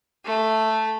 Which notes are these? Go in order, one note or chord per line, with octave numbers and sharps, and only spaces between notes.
A3